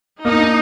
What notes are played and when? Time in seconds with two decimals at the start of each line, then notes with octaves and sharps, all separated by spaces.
0.24 A#3 D#4
0.39 D4